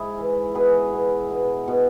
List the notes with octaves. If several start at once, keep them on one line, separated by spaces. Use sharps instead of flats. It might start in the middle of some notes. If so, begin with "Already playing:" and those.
Already playing: G#2 E4 G#4
E3
B2 G#4 B4
B2
B2
B2